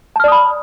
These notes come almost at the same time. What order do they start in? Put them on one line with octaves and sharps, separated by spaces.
A5 F6 D5 D#6 B5